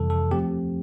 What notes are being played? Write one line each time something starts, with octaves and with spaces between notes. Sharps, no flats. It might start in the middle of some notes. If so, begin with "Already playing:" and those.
Already playing: F2 C3 E3 G3 A4
A4
F3 A3 C4 G4